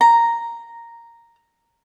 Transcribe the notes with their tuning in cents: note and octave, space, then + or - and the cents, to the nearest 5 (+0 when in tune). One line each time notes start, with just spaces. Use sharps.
A#5 -5